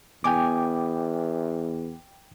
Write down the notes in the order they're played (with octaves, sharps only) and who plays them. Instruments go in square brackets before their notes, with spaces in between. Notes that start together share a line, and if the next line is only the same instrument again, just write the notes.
[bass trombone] E2 [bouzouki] B3 G#5 [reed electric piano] G5 D6